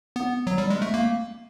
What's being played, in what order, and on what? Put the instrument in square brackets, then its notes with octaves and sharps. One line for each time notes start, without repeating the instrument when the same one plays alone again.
[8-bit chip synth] B3
F#3
G3
G#3
A3
A#3